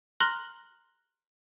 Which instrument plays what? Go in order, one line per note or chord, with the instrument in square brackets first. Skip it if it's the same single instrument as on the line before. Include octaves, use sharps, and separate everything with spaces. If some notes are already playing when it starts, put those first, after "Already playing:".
[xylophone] A#5 C6 F6 F#6 A#6 F#7